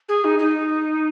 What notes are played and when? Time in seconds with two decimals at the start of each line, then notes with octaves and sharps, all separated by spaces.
0.09 G#4
0.25 D#4
0.39 D#4